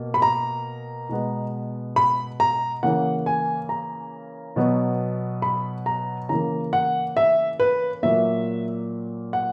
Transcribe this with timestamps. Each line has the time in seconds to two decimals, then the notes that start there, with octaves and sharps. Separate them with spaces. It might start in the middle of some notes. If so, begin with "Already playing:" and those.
Already playing: B2 A#3
0.14 B5
0.22 A#5
1.09 B2 G#3 B3
1.96 B5
2.40 A#5
2.83 C#3 E3 A#3 F#5
3.26 G#5
3.69 A#5
4.56 B2 F#3 B3
5.42 B5
5.86 A#5
6.29 C#3 E3 A#3 A#5
6.73 F#5
7.17 E5
7.60 B4
8.03 A#2 F#3 A#3 E5
9.33 F#5